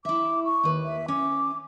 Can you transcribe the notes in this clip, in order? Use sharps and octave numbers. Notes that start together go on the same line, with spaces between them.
E4 E5 D6
C#6
D#2 B4
E5
C#4 D6